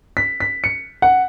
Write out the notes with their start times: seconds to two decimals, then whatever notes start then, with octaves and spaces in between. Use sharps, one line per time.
0.17 B6
0.40 B6
0.64 C#7
1.02 F#5